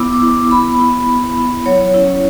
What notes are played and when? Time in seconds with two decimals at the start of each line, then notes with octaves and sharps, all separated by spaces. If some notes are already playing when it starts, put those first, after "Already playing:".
Already playing: B3 E4 D6 E6
0.13 D6
0.22 E4
0.31 D6
0.51 B3 B5
0.80 E4
1.09 B3
1.37 E4
1.66 F#3 C#5
1.94 C#4 E4